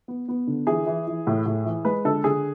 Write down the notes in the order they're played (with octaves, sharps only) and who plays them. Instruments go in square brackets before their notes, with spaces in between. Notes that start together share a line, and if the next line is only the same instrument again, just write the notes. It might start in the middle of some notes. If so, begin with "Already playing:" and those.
[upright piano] B3
B3
D3
E3 G#4
E3
E3
A2
A2
E3
G#3 B4
D3 A4
D3 G#4